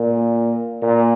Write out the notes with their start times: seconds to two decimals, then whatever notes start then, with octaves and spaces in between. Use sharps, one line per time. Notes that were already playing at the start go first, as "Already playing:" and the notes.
Already playing: A#2
0.82 A#2